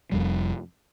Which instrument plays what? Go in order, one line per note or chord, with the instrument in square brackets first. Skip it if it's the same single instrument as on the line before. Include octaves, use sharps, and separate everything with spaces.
[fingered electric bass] F1 F2 C3 G3